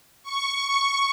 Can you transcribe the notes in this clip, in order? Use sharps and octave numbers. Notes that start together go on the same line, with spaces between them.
C#6